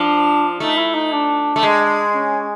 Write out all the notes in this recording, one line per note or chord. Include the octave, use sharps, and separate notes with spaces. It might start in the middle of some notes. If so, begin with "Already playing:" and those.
Already playing: F3 D4
A3 D#4
E4
D#4
D4
A3
G#3
C#4